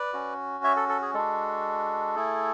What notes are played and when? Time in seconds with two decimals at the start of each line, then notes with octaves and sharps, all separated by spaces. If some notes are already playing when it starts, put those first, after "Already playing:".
Already playing: B4 D5
0.13 C#4 F#4
0.64 C#5 E5
0.76 A4
0.89 A4
1.02 G#4
1.14 G#3 D4 F#4 A4
2.16 A3 E4 G#4